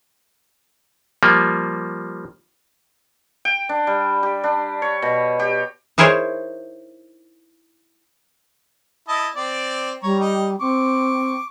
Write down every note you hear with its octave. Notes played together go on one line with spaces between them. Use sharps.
F3 G3 A#3
G5
D4
G3
G4
D4
C#5
B2
G4
D#4 E4 G#4 A#4 C5 C#5
E4 D#5 A5
C4 D5
G3 C#5 A#5
D#4 G4
C4 C#6 D6